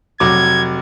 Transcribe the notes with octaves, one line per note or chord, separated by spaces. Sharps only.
F1 F#3 D6 G#6